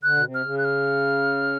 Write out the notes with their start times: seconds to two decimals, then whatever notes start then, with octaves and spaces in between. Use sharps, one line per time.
0.03 D3 F#6
0.16 B2
0.24 C3
0.34 F6
0.44 C#3
0.58 F#6
0.64 F6